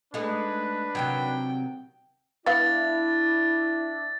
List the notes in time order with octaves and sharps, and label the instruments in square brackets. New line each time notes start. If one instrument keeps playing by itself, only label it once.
[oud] G#3 A3 D#4 [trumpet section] D4 B4
[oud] C3 D#3 F#3 [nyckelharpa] G5
[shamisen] B3 F5 [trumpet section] D4 D5 E5 [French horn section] E4 [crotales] A6